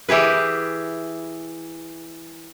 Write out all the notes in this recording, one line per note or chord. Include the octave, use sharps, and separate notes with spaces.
E3 G4 G#4 B4